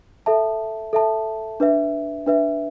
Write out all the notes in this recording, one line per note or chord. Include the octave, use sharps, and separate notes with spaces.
A4 E5 A5
A4 E5 A5
D4 B4 E5
D4 B4 E5